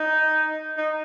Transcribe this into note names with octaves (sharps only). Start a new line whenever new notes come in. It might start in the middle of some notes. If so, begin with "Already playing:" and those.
Already playing: D#4
D#4